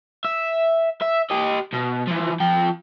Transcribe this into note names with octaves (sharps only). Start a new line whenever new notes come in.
E5
E5
G4 D#5
B2
E3 F3
F3 G5